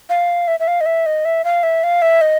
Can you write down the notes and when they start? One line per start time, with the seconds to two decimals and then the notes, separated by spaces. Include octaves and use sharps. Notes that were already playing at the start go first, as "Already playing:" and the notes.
0.10 F5
0.48 E5
0.60 E5
0.68 F5
0.81 D#5
0.86 E5
1.06 D#5
1.25 E5
1.45 F5
1.63 E5
1.84 F5
2.02 E5
2.21 D#5